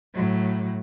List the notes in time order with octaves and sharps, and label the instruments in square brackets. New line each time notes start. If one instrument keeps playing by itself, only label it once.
[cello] A2 F#3